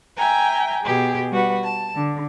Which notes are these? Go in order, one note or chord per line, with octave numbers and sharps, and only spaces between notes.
E5 G5 G#5 A#5
B2 G4 G#4
G3 F#4 B4
A5
D3